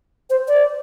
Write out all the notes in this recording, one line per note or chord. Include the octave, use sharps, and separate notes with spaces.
C5
D5